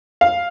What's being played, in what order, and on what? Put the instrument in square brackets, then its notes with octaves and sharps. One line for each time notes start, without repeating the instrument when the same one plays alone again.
[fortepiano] F5